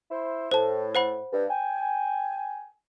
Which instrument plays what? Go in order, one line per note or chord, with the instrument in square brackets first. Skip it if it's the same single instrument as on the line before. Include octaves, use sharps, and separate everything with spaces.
[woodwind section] E4 C5
[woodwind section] A2 [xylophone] C5 A5
[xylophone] C5 F#5 B5
[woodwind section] G2
G5 G#5